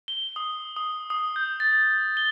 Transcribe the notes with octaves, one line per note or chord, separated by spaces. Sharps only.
G7
D#6
D#6
D#6
G6
A6
G7